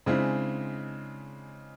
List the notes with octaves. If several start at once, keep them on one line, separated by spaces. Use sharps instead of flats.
C#3 G#3 C4 D4 E4